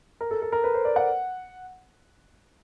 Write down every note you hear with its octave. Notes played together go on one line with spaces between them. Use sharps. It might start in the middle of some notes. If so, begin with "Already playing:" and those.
A#4
A4
A4
A#4
B4
C5
D5
F#5